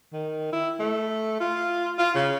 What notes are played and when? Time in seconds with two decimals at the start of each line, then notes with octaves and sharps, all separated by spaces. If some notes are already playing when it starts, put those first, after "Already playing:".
0.13 D#3
0.53 E4
0.79 A3
1.40 F4
1.99 F4
2.15 C#3